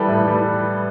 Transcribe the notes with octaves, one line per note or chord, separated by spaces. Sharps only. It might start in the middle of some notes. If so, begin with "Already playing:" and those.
Already playing: E3 G3 A4 B4
A2
E3 G3